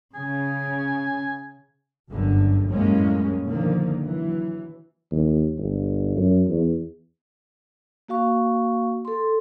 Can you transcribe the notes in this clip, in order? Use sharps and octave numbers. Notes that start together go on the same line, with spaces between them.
C#3 G#5
G1 F#2 D3
F#2 A2 G3 G#3 A#3 C#4
B2 D3 D#3 F3 A#3
E3 F#3
D#2
G1
F#2
E2
A#3 F#4 F5 C#6
A4 C6